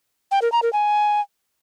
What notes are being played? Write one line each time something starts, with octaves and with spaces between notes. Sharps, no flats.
G5
A#4
A#5
A#4
G#5